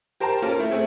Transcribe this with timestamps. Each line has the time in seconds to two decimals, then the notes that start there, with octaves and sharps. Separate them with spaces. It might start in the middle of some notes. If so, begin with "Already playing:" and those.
0.20 G4 A#4 C5 G5 A5 A#5
0.42 A#3 C#4 F4 A4 A#4
0.59 A3 E4
0.71 A3 C4 G#4